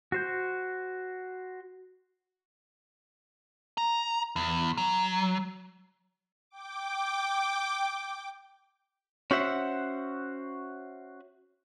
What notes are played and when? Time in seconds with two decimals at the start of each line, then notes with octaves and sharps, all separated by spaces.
0.12 F#4 C5 G6
3.78 A#5
4.36 E2
4.77 F#3
6.50 G5 D6
9.31 C#4 F#4 C5 E5 F#5